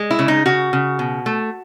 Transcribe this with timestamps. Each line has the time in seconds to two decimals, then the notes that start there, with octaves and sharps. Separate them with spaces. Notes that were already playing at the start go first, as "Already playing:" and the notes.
Already playing: G#3
0.11 E4
0.19 C#3
0.28 D#4
0.46 C#3 F#4
0.73 C#3
0.99 B2
1.26 A3